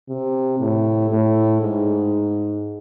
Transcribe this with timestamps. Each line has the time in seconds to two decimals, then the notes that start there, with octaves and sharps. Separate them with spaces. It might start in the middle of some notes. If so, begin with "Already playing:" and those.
0.09 C3
0.59 A2
1.10 A2
1.61 G#2